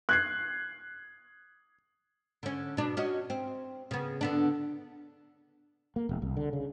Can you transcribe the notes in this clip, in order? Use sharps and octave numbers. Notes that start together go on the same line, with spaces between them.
F#6 G#6 C7
D3 C#4
B2 D4
C#4 F#4 D#5
C4
C#3 B3
D3 B3 D4
A#3
E1
C2
D3
C#3